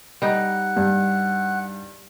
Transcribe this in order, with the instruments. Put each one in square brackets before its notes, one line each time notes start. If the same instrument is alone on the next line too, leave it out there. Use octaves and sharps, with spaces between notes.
[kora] G3 D#4 [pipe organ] F#5 F#6
[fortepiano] G2